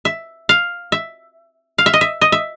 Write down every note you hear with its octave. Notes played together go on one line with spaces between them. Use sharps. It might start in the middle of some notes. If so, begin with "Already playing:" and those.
E5
F5
E5
F5
E5
D#5
E5
D#5
E5